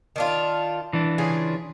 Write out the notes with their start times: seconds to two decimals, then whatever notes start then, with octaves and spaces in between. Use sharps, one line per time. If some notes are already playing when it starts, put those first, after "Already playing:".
0.16 D#3 D4 F4
0.93 E3 D4
1.18 C#3 F4 G#4